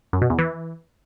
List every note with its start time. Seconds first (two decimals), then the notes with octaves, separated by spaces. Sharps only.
0.13 F#2
0.22 B2
0.30 E2
0.38 E3